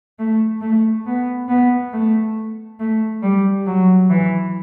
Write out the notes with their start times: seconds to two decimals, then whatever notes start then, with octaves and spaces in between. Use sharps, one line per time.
0.19 A3
0.62 A3
1.06 B3
1.48 B3
1.92 A3
2.80 A3
3.22 G3
3.66 F#3
4.10 E3